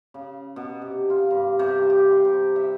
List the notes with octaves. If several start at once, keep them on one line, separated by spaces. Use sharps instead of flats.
C#3
B2
C3
F4
G2
C3
G4
C6
C3
E5